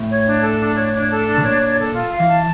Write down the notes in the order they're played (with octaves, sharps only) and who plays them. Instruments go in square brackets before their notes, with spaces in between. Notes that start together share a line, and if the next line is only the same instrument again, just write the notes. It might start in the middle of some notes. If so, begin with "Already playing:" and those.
Already playing: [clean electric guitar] A2
[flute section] C#5
D4
A4
D4
C#5
D4
A4
D4
[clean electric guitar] C#3
[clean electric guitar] A#2 [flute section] C#5
[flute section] D4
A4
F4
F5
[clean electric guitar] E3
[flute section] A5